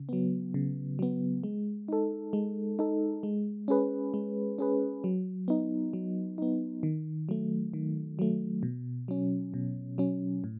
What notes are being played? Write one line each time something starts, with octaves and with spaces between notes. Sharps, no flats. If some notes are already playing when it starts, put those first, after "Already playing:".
Already playing: C#3
F#3 B3
C#3
F#3 B3
G#3
D#4 A4
G#3
D#4 A4
G#3
C#4 G#4 B4
G#3
C#4 G#4 B4
F#3
B3 D#4
F#3
B3 D#4
D#3
F#3 A3
D#3
F#3 A3
B2
F#3 C#4
B2
F#3 C#4
A2